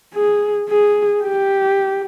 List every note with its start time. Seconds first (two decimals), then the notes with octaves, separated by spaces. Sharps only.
0.14 G#4
0.69 G#4
1.23 G4